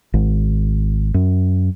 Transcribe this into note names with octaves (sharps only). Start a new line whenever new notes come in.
G#1
F#2